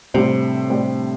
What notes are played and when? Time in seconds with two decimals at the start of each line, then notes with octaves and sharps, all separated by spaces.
0.14 A2 C3 G3 D4 G4 C5
0.70 A2 G3 D4 G4 C5